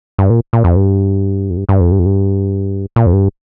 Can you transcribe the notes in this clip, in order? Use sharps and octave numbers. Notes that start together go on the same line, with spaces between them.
G2
A#2
A#2
F2
G2
F2
G2
G2
F2
G2
F2
G2
A#2
F2
G2